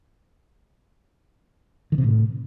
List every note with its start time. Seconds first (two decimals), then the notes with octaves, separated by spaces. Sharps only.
1.92 D#3
1.98 C3
2.04 A2